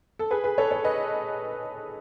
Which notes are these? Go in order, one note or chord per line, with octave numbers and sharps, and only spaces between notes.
A4
G#4 B4
G#4 B4
A4 C#5
A4 C#5
B4 D#5